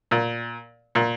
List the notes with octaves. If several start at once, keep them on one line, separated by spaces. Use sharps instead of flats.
A#2
A#2